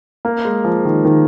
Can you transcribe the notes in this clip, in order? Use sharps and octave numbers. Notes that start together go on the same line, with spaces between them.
A#3
G#3
F3
D#3
D#3